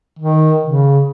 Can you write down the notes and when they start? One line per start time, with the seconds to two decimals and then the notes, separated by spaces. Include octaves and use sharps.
0.19 D#3
0.66 C#3